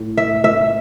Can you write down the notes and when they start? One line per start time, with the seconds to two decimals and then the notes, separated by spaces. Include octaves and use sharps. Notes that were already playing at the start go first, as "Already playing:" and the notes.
Already playing: A2
0.17 E5
0.44 E5